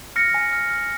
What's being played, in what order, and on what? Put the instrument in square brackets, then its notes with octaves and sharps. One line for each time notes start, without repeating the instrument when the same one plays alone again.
[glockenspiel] F6 A#6 C#7
G#5
F6
F6